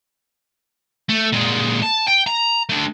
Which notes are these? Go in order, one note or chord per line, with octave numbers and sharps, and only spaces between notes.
A3
A#2 G#3
A5
G5
A#5
A3 D4